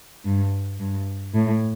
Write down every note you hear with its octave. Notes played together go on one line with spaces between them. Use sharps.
G2
G2
A2